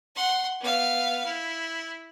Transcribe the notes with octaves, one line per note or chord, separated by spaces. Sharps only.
F#5 C6
B3 F5
E4